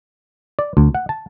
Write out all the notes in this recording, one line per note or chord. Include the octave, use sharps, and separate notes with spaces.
D5
D2
F#5
A5